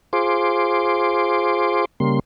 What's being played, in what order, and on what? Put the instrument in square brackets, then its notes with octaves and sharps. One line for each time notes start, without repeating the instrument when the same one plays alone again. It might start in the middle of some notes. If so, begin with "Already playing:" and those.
[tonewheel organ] F4 G#4 C5 C6 D6
C#3 G3 A#3 C6